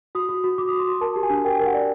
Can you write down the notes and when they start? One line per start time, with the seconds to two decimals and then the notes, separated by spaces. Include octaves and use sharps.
0.15 F#4 D#6
0.29 F#4
0.44 F#4
0.58 F#4 D6
0.69 D#6
0.72 F#4
0.79 C6
0.87 F#4
1.01 A#4 A5
1.16 G4
1.23 G#5
1.30 D4
1.45 A#4 G5
1.59 A#4
1.66 F#5
1.74 D5